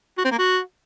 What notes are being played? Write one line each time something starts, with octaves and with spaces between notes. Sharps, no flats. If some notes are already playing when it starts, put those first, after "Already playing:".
F#4
C4
A#3
F#4